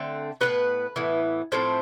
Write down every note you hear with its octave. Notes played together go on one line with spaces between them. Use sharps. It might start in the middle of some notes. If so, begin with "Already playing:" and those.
Already playing: D3 A3 C4
A2 E3 B3 B4
A2 E3 B3
A2 F3 A3 C4 C5